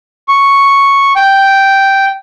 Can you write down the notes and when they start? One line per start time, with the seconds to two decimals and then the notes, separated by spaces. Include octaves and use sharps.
0.28 C#6
1.16 G5